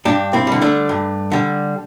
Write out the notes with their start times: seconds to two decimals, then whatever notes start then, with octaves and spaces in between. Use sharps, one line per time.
0.05 G2 D4 G4
0.33 C4 E4
0.47 D3 G3
0.61 A3 D4
0.89 G2
1.32 D3 G3